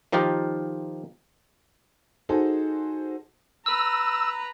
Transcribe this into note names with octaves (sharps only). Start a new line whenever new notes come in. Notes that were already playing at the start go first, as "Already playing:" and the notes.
D#3 F3 D#4 F4 G4 A#4
D#4 F#4 G#4 A4 C5
B4 A#5 E6